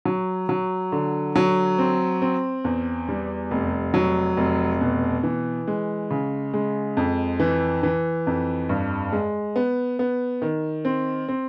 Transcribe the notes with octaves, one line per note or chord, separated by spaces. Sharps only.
F#3
F#3
D3
F#3
C4
C4
E2
G3
F1
F#3
F1
B2
E3
G#3
C#3
G#3
F2
E3
E3
F2
G2
G#3
B3
B3
D#3
C4
C4